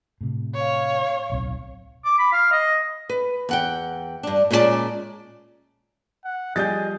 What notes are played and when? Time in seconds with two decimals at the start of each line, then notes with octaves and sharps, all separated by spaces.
0.21 A2 C3
0.55 C#5 F5
1.30 D1 B1 C4
2.05 D6
2.19 B5
2.33 F5
2.52 D#5
3.09 B4
3.49 E2 F#5 G5
4.23 G2 D4
4.51 A#2 G#3 C#4 D#4 D5 A5
6.25 F#5
6.56 F3 G3 G#4 D#5 G6 A6